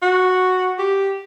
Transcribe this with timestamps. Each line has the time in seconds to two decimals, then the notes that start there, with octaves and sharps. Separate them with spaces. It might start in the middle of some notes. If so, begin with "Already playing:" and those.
0.02 F#4
0.79 G4